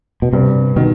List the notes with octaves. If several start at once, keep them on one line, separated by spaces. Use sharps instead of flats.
B2
G2 C3
B2 D#3